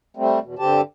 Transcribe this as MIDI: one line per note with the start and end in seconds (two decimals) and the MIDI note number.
0.17 0.39 55
0.17 0.39 57
0.17 0.39 60
0.42 0.55 40
0.42 0.55 47
0.59 0.81 43
0.59 0.81 50
0.59 0.81 60
0.59 0.81 67
0.59 0.81 81